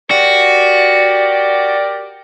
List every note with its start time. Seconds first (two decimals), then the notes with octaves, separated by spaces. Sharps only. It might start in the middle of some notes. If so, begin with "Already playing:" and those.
0.11 F#4 G4 A#4 D5